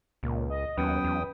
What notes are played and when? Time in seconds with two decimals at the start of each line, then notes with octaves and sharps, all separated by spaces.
0.23 C#2 A#2
0.50 D#5
0.77 D#2 F#3 B3 C#4 B4 G5 D#6
1.04 E2